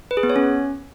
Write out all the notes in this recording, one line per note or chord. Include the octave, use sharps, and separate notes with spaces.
B4
G#4
B3
C#5
C#4